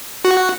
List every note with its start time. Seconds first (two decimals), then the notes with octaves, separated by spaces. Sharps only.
0.25 F#4